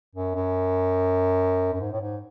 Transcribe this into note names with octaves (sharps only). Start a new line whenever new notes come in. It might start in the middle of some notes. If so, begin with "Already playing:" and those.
F#2
F#2
F#2
G#2
A2
G#2